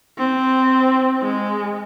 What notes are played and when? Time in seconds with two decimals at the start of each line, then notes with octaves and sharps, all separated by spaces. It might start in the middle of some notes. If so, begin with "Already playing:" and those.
0.18 C4
1.22 G#3